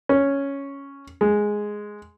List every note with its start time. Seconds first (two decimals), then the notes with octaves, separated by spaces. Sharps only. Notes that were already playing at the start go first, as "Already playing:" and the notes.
0.09 C#4
1.21 G#3